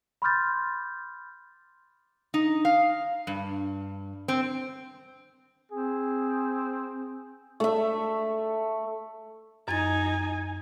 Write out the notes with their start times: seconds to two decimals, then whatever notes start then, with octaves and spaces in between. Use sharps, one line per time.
0.22 B5 C6 D6 F6 G6 A6
2.34 D#4
2.65 F5
3.27 G2
4.28 C4
5.72 C4 G#4
7.60 A3 E5
9.68 F#2 D#4 G#5 A6